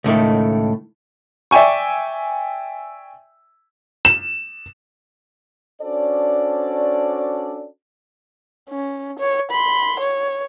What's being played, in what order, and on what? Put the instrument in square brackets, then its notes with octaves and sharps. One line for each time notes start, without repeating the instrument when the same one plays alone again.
[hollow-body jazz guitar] C#2 A2 D#3 A3
[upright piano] D5 E5 G5 G#5 C#6
[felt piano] E7
[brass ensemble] C#4 D4 F#4 A4 C5 D5
[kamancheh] C#4
C#5
B5 C6
C#5